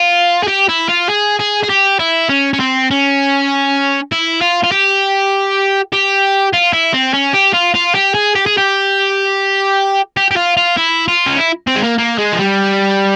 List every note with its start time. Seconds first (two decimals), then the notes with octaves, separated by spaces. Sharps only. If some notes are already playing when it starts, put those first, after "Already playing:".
Already playing: F4
0.43 G#4
0.47 G4
0.69 E4
0.89 F4
1.09 G#4
1.39 G#4
1.63 G#4
1.69 G4
1.99 E4
2.29 C#4
2.53 C#4
2.60 C4
2.91 C#4
4.12 E4
4.41 F4
4.64 F4
4.72 G4
5.93 G4
6.53 F4
6.73 E4
6.93 C4
7.14 C#4
7.34 G4
7.54 F4
7.75 F4
7.95 G4
8.14 G#4
8.35 G4
8.46 G#4
8.58 G4
10.17 G4
10.31 G4
10.36 F4
10.57 F4
10.77 E4
11.08 F4
11.26 C#4
11.37 E4
11.67 C4
11.76 G#3
11.84 A#3
11.98 A#3
12.18 G#3
12.33 F3
12.39 G3